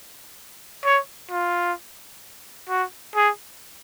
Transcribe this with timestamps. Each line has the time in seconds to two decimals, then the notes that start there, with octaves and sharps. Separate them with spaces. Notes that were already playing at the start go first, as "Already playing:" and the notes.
0.85 C#5
1.31 F4
2.69 F#4
3.16 G#4